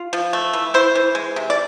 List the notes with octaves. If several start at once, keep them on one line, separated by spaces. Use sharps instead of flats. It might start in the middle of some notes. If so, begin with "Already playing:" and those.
Already playing: F4
F3
A3
E3
E4 C5
E3
G#3
C3
D5